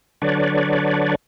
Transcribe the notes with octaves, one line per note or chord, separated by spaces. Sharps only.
D3 F#3 D4 B4 C#5 D5